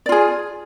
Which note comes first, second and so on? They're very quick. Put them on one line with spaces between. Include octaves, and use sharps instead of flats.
D5 F4 G#4